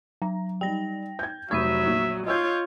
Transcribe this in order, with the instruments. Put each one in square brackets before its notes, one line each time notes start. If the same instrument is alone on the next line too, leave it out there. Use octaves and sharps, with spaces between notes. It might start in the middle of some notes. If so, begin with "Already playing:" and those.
[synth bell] F#3 [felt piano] A#5
[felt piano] G3 D#4 [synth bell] G5 A#6
[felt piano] G6 G#6
[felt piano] F1 B5 G#6 [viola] F#3 [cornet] E5 [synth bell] C#6 D#6 D#7
[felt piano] A#1
[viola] F4 C#5 [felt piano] D#5 E6 G6